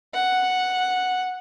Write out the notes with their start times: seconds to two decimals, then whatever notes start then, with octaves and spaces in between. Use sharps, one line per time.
0.14 F#5